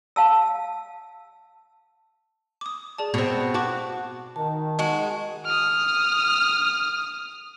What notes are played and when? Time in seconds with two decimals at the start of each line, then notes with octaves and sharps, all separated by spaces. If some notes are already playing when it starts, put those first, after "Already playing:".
0.16 F5 A5 E6
2.61 D6 D#6
2.98 G#4 D5 A5
3.14 B2 C4
3.54 F#4 A5 D6
4.36 D#3 A5
4.79 G#3 F#4
5.45 D#6 F6